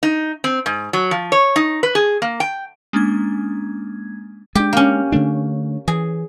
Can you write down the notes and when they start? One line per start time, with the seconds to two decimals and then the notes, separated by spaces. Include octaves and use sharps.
0.03 D#4
0.44 C4
0.66 G#2
0.93 F#3
1.11 F3
1.32 C#5
1.56 D#4
1.83 B4
1.95 G#4
2.22 A#3
2.40 G5
2.93 G#3 A#3 C#4 D4 G#6
4.55 G#3 D4 G4
4.73 A#3 C#4
5.12 D3 A3 D4
5.88 E3 G#4